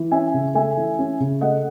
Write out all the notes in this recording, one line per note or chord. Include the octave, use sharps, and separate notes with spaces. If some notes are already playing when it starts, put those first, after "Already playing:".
Already playing: E3
C#4 E5 G#5
C#3
A3 E5 G#5
E3
C#4
C#3
A3 D#5 F#5